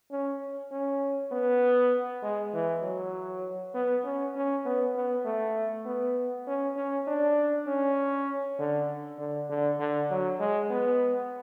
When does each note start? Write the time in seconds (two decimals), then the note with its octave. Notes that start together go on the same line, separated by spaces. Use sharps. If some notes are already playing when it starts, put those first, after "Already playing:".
0.11 C#4
0.72 C#4
1.32 B3
2.22 G#3
2.54 E3
2.83 F#3
3.74 B3
4.04 C#4
4.35 C#4
4.66 B3
4.95 B3
5.25 A3
5.86 B3
6.47 C#4
6.76 C#4
7.07 D4
7.67 C#4
8.59 D3
9.19 D3
9.50 D3
9.80 D3
10.10 F#3
10.40 G#3
10.70 B3